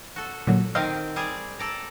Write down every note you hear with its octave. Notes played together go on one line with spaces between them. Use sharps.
F#4 A4
A#2 D3 F#3
D#3 C4 D#5 F5
G3 G#4 D5
A4 D5 A#5